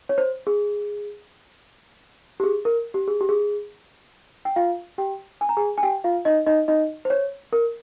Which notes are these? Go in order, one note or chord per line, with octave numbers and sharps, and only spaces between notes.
C#5
C5
G#4
G4
G#4
A#4
G4
G#4
G4
G#4
G5
F4 F5
G4 G5
G#5
A#5
G#4 G#5
G#5
G4 G5
F4 F5
D#4 D#5
D#4 D#5
D#4 D#5
C5
C#5
A#4